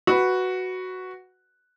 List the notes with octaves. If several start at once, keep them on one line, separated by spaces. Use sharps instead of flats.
F#4 B4